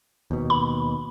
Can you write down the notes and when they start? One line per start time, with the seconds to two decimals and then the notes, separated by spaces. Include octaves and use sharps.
0.31 D#2 B2
0.50 B5